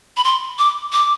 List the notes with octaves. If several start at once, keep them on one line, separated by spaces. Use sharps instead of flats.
B5
C6
D6
D6